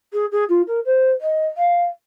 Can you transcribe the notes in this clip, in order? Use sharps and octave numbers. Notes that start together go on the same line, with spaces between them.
G#4
G#4
F4
A#4
C5
D#5
F5